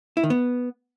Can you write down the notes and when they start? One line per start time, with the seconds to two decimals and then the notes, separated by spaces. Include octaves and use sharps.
0.17 E4
0.24 D#3
0.30 B3